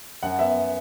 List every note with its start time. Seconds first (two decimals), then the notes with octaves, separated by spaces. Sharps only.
0.23 F#2 F#5
0.39 B3 E5
0.57 B3